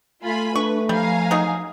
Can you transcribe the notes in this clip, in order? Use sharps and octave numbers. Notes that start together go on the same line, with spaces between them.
A3 F4 G#5 B5
D4 B4 C#6
F3 G3 F5 G#5 A#5
F#3 D#4 G#4